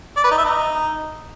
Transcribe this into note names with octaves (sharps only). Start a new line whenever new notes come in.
D5
B4
D#4
E5
D#4